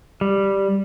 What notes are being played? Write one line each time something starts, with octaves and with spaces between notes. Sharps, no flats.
G3